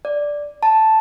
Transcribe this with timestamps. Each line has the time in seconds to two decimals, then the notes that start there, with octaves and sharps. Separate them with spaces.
0.05 D5
0.63 A5